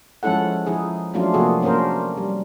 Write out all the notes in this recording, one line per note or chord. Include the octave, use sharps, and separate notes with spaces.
F3 G#3 C#4 E4 A4 F#5
F3 D#4 E4 G#4
F3 F#3 A3 C#4 D4 F4
C3 F3 A#3 F#4 G#4 A4
A#3 C#4 D4 A#4 C5
G3